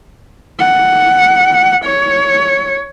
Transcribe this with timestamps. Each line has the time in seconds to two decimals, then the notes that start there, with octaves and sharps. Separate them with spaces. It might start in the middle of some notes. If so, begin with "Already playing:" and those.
0.59 F#5
1.85 C#5